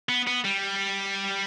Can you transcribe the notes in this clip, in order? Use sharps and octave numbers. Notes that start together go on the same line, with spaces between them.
B3
B3
G3